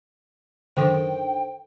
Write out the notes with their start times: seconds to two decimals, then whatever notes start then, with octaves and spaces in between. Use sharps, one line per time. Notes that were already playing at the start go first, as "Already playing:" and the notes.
0.77 F#2 D3 D#3 A4 C5 G5